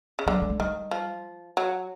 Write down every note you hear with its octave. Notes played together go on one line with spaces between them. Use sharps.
C#3
D3 F#3
A3
G#3
D#3 G3
F3
F#3